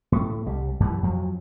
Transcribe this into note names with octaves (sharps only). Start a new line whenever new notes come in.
A2 A3
C2 G3
F#2 E3 G3
F2 F3 F#3